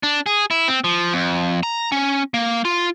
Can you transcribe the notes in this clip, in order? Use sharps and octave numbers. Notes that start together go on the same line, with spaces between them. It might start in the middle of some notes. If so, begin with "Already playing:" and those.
D4
G#4
E4
C4
F3
F2
A#5
C#4
A#3
F4